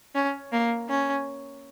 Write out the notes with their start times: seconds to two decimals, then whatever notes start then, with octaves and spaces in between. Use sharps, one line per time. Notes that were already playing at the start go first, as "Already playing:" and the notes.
0.15 C#4
0.52 A#3
0.89 C#4